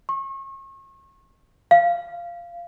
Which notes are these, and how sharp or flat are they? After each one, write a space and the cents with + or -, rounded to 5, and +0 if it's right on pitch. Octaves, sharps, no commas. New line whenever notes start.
C#6 -35
F5 -15